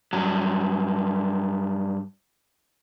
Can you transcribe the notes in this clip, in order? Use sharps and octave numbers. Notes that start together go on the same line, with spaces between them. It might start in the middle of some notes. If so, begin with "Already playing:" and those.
G2 F#3